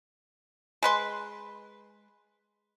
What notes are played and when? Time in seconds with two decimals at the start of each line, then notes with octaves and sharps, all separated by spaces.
0.83 G#3 B4 C6